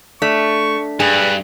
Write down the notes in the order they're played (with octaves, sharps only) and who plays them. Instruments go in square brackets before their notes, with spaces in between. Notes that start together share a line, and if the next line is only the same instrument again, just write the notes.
[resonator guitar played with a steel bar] A3 [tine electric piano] D4 B6 [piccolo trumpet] C#6
[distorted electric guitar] G2 [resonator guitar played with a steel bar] G#4 [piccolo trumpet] B4